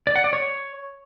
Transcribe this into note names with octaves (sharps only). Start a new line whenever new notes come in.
D5
F#5
D5
C#5